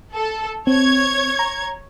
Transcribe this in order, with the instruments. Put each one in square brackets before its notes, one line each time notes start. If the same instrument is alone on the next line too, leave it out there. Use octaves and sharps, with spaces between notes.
[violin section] A4
[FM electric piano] C4 [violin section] C#5 G#6
[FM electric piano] A#5